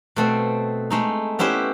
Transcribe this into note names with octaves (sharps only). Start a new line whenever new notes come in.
B2 A3 C4
G#3 A3 D#4
B3 C#4 E4 G4 C5